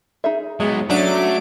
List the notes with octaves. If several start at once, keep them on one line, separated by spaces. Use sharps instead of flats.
D#4 G#4 E5
F#3 G#3 B3
F#3 A3 C#4 D4 D6 D7